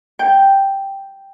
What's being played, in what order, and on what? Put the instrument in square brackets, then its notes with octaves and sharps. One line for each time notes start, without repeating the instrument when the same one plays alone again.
[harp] G5